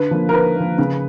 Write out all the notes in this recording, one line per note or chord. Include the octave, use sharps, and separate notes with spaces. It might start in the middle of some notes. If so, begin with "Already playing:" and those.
Already playing: D3 B4
F3 A#3
A#4
D3 B4
F3 A#3
C#3